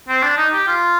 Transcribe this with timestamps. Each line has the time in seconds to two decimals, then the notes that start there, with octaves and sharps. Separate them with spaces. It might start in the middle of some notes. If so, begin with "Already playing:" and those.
0.09 C4
0.22 D4
0.37 D#4
0.52 G4
0.68 F4